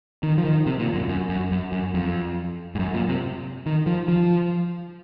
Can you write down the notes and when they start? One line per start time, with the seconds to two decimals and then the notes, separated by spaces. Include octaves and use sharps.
0.23 D#3
0.38 F3
0.45 D#3
0.66 C3
0.79 A#2
0.94 F#2
1.09 F#2
1.29 F#2
1.51 F#2
1.72 F#2
1.94 F2
2.75 G#2
2.79 F#2
2.94 A#2
3.09 C3
3.66 D#3
3.86 F3
4.08 F3